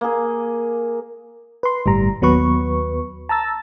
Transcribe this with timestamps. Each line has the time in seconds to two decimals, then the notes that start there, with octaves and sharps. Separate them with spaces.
0.01 A#3 G#4
1.63 B4 C6
1.86 G1 A2 G3 A#5
2.21 D#2 F#3 B3 B4 C#6
3.29 A5 A#5 E6 A6